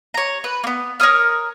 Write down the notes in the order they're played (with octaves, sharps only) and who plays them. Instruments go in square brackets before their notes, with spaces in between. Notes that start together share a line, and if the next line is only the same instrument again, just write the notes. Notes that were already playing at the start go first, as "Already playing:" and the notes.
[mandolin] C#5 A#5
B4
A#3 B3
A#4 C#5 D#6 F6